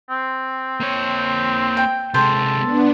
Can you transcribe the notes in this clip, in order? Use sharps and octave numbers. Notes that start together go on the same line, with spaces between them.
C4
A#3 C#5
G5
C3 G#3 A4 C5
B3 D4